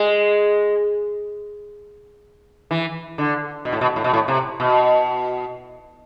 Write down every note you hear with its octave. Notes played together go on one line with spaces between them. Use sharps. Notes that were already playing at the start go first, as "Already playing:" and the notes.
Already playing: G#3
E3
D3
B2
A2
B2
A2
B2
A2
C3
B2